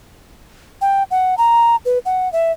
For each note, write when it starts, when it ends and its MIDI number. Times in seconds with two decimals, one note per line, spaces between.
0.81 1.03 79
1.11 1.35 78
1.38 1.76 82
1.85 1.99 71
2.06 2.31 78
2.33 2.52 76